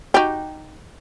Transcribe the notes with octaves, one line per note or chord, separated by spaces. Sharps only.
D#4 F#4 G4